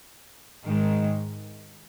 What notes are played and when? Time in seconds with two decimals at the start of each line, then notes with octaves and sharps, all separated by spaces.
0.65 G#2 D#3 G#3